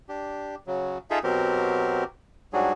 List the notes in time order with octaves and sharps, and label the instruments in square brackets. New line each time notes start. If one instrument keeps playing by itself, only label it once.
[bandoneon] D4 G4
C#3 F#3
D#4 F4 G#4 A4 E5
B2 F#3 C4 G4 A#4
G#2 F#3 G3 D4 F#4 G#4